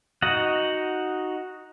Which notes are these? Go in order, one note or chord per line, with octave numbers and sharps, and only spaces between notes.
D#4 F#4 D#5 F#5